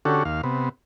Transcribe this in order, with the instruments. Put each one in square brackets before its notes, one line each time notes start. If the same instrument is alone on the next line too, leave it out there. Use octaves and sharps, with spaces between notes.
[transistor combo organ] D3 C#4 F#4 G4 A4
D#2 F5
C3 B3